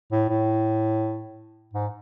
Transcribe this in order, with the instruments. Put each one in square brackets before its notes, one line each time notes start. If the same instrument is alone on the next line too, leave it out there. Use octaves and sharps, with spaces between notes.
[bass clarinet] A2
A2
G#2